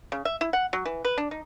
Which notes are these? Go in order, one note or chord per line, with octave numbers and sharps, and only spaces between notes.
C#3
E5
E4
F#5
F#3
E3
B4
D4
D#4